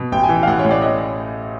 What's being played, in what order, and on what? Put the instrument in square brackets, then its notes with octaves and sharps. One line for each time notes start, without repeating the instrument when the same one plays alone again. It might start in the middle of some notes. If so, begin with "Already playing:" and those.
Already playing: [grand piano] B2
A1 G5
G#5
E3
G5
F5
A1 F#5
C#5
A2
D5
D#5